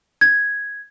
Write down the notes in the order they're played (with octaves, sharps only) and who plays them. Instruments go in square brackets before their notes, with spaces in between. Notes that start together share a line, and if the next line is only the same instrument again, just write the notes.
[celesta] G#6